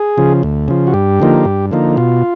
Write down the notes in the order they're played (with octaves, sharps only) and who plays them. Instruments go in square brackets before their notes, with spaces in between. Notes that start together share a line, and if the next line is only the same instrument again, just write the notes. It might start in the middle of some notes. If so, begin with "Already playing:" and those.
Already playing: [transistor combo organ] G#4
C#3 F3
D2
C#3 F3
F#4
G2 G4
D3 F3 A#3 D#4
G2
D3 F3 A#3 D#4
B2 F4